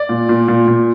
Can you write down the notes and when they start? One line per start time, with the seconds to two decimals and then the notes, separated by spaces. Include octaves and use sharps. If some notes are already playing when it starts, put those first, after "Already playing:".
Already playing: D5
0.09 A#2
0.29 A#2
0.48 A#2
0.68 A#2